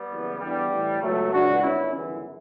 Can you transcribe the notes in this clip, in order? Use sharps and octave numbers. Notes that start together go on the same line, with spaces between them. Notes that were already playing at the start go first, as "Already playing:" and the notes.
Already playing: G3 B3
F#1 E2 C#3 E3
E2 D3 G3
A1 A2 E3
C#2 B2 F#3 A3
C#2 C#3 E3 D4 F#4
G1 F#2 D3 C#4 E4
G1 F#2 C#3 E3